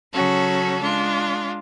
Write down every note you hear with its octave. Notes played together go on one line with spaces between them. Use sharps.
C#3 F#3 C#4 F#4 A4
G#3 D4 F4